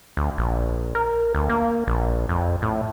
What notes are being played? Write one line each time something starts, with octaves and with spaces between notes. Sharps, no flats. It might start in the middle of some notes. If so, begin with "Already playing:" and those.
D2
A#1
A#4
D2
A#3
A#1
F2
A2